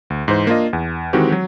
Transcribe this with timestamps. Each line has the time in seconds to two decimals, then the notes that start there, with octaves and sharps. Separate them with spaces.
0.10 D2
0.28 G#2 E3 C5
0.47 A#3 D4 F4 D#5
0.73 E2
1.13 D#3 E3 G#3 C4 F#4 G4
1.32 F#3